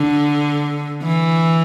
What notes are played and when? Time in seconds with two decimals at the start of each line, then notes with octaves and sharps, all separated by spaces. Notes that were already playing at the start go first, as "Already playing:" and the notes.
Already playing: D3
1.03 E3